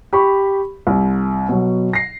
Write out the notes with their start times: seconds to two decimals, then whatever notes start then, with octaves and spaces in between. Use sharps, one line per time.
0.13 G4 B5 C#6
0.87 C2
1.49 B2 F#3
1.93 A#6 C7